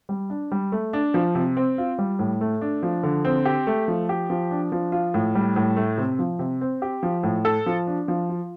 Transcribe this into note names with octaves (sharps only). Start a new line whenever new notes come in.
G3
D4
G3
A3
D4
F3
C3
C4
F4
G3
A2
A3
D4
F3
D3
C4
G4
A3
F3
G4
F3
D4
F3
F4
A2
G3
A2
A3
C3
F3
C3
C4
G4
F3
A2
A4
F3
D4
F3
F4